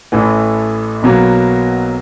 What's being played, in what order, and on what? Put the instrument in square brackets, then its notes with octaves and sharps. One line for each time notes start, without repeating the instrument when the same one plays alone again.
[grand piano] A1 A2 E3 A3
B1 B2 F#3 A#3